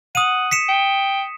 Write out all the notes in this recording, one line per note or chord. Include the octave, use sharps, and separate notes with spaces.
F#5 D#6 D#7
B6 C#7 E7
G5